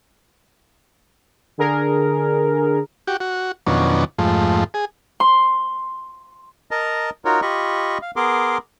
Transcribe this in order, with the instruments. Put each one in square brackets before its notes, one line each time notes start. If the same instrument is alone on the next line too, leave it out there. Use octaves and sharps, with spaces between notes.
[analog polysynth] D3 G#4 A#4
[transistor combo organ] F#4 G4
F#4
F2 B2 D#3 F#3 C#4 D4
F2 G#2 F3 A3
G#4
[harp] C6
[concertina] A#4 D#5 A5 A#5
D#4 F4 F#4 A#4 C#5
F4 G4 D#5 B5 C#6
F5
B3 G#4 A#4 C6 D6